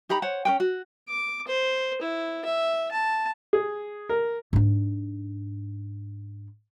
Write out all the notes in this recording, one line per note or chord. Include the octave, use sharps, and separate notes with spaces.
D#4 G4 A#5 B5
C5 C#5 F#5
C#4 B4 G5
F#4
D6
C5
E4
E5
A5
G#4
A#4
G#2 D4